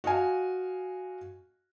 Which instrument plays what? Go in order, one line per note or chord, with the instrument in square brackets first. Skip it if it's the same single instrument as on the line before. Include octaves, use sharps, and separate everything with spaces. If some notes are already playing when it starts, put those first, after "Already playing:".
[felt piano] F#4 D#5 F5 G#5